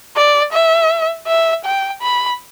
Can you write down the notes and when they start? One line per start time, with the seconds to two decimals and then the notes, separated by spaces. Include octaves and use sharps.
0.16 D5
0.53 E5
1.27 E5
1.65 G5
2.02 B5